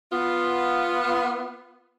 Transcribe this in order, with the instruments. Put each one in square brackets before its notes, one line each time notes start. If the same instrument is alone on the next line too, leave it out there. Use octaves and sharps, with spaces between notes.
[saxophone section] B3 F4